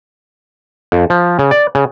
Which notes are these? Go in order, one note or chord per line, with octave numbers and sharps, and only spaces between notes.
F2
F3
C#3
D5
C#3